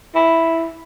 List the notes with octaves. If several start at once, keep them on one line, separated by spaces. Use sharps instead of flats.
E4